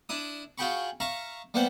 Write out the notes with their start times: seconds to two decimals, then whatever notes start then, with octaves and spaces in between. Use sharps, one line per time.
0.09 D4 E4 D#6
0.58 F4 F#4 G#4 G5 B5 C#6
1.00 E5 F5 A#5 C#6
1.54 G3 A#3 B3 C5 F#5